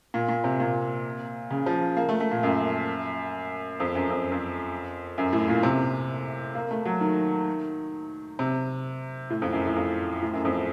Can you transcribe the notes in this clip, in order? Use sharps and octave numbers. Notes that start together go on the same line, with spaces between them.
A#2
A#2
C3
A#2
C#3
F3
A#3
A3
A3
A#2
F#2
F2
F#2
F2
F2
F#2
A2
A#2
C3
A#3
A3
F#3
D#3
C3
A2
F2
F#2
A2
F2
A2
F#2
F2